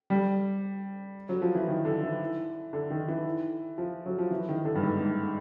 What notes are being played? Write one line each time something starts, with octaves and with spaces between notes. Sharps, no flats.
G3
F#3
F3
E3
D#3
D3
E3
D3
D#3
E3
F3
F#3
F3
E3
D#3
D3
G2
G#2
G#2